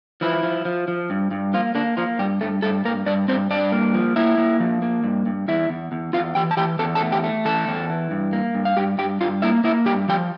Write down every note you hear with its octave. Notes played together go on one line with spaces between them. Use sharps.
E3 F3 E4
F3
F3
F3
G2
G2
F3 A#3 F4
D3 A#3 D4
F3 A#3 F4
G2 G3 G4
G2 A3 A4
G2 A3 A4
G2 A#3 A#4
G2 D4 D5
G2 C4 C5
G2 D4 D5
A#3
F3
A#3 E4 E5
A#3
F3
A#3
G2
G2
E2 E4 E5
E2
E2
E2 F4 F5
E3 G4 G5
A5
E3 G4 G5
E2 A4 A5
A4 A5
A3
G4 G5
A3
E3 A4 A5
E2
E3
G2
A#3
G2
F5
G2 G4 G5
G2 G4 G5
G2 F4 F5
A#3 E4 E5
A#3 E4 E5
G2 G4 G5
F3 G4 G5